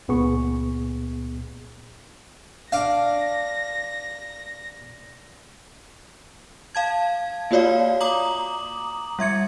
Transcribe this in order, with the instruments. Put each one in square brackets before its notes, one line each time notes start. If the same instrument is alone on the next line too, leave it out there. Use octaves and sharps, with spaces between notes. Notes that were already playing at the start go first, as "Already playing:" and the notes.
[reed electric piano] C#2 A#2 B3 G#4 C#6
[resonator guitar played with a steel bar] D4 [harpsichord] F5 D6 [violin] A#6
[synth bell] F5 A5 G#6
A#3 F4 F#4 C#5 D5 F5
A#5 D6 D#6 F#7
G3 E5 G#6 C#7